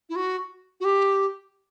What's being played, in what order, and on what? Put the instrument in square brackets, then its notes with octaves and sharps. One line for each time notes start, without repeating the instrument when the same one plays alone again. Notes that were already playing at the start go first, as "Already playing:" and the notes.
[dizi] E4
F#4
F#4
G4